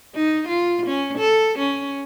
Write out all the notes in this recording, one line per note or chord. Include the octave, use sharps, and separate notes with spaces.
D#4
F4
C#4
A4
C#4